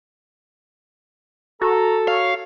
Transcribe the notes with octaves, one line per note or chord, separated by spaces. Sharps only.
F#4 A4 A#5
C#5 F5